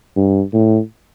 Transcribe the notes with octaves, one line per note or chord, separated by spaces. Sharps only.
G2
A2